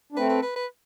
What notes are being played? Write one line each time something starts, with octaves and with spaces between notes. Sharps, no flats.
D4
A3 C4 B4
B4
B4
B4